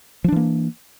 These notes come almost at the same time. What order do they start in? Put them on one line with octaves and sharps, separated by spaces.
F3 D4 E3 A#3